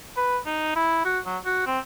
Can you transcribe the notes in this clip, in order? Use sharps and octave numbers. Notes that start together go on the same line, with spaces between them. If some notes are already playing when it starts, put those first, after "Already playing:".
B4
D#4
E4
F#4
F#3
F#4
C4